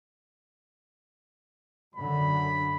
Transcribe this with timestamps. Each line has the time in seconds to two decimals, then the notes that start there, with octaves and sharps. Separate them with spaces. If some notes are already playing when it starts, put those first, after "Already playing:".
1.96 F#2 D3 B5